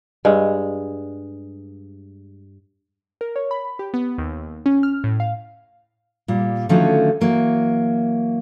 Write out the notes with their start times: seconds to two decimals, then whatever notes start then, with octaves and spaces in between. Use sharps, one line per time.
0.25 G2 G#3
3.21 A#4
3.36 C#5
3.51 B5
3.79 G4
3.94 B3
4.18 D#2
4.66 C#4
4.83 F6
5.04 A2
5.20 F5
6.28 A#2 G3
6.69 D3 D#3 F3 F#3 A3 C#4
7.20 E3 F#3 A#3